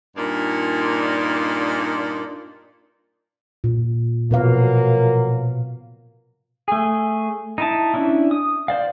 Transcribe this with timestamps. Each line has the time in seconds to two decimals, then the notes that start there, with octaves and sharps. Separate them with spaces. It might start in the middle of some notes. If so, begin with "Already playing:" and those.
0.16 G2 A#2 A#3 D4 D#4
3.64 A#2
4.31 B2 F3 F#3 A#3 B4 F5
6.68 A3 G#4
7.58 D#4 E4 A5
7.94 C#4 D4 E4
8.31 D#6
8.68 C5 D5 F5